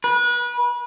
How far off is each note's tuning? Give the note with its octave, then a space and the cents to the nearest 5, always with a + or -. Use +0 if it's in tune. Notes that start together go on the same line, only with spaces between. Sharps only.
B4 -30